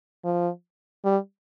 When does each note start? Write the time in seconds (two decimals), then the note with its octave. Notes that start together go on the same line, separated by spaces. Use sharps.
0.25 F3
1.05 G3